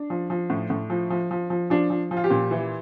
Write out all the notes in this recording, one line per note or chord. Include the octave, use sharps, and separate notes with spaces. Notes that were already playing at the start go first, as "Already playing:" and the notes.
Already playing: D4
F3
F3
A2
A2
F3
F3
F3
F3
F3 D4
F3
F3
F4
G4
A#2
E3